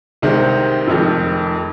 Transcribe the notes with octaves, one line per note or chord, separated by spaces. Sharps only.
C2 C3 D#3 G#3 C4
F1 F2 D#3 G#3